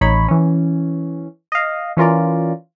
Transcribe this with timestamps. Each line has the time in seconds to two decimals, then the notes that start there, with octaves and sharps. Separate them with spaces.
0.01 A1 D#4 C#5 B5
0.28 E3 C#4
1.52 D#5 F5
1.97 E3 C#4 F4 A#4 D5